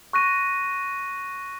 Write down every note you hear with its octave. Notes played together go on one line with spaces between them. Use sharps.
C#6 F#6 A#6 D#7